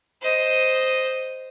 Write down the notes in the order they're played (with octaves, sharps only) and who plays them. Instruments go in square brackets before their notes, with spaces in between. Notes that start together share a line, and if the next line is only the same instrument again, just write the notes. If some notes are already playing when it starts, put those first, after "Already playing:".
[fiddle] C5 D#5